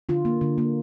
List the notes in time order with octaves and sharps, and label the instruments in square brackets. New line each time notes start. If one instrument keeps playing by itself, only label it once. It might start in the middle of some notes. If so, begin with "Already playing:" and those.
[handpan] D3 F4
A#3
D3
A#3